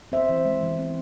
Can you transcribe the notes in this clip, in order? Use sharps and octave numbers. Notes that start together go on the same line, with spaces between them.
C4 C5 E5
E3
G#3
E3
C4